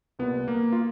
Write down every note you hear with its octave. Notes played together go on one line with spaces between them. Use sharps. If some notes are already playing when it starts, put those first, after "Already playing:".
C2 A#2 B3
A#3
F4